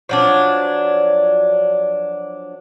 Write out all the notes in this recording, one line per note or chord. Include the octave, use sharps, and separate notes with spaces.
F3 F#3 D4